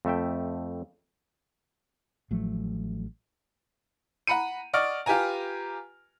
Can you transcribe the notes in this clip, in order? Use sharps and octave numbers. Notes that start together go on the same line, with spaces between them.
F2 A3 E5 G5
A1 F3 F#3 A3
F#5 A#5 B5 C#7 D#7
D5 D#5 F#5 C#6 F6 D7
F4 G4 B4 G#5 A#5